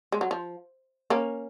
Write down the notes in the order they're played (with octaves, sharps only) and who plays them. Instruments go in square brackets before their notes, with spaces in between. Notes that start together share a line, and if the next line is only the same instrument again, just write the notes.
[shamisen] G#3
F#3
F3
A#3 C#4